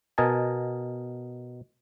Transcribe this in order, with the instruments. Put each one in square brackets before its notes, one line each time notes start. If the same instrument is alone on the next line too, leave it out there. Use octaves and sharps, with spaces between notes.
[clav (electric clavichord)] B2 A#4 D#5 G#5 A5